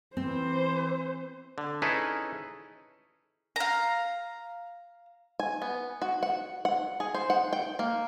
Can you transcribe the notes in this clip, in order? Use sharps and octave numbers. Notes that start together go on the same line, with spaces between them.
E3 C4 C5
D3
C#4 D#4 E4 G#4 A4 B4
F5 A#5
G#5
B3
F#4
F#5
F#5
G#4
C5
F#5
G5
A#3